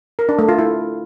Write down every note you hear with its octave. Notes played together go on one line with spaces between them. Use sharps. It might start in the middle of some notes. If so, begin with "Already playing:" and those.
A#4
D4
A3
F4
E4